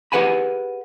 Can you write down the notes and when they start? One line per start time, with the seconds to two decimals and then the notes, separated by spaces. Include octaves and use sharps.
0.12 G4 G#4 B4 F#5 G#5 B5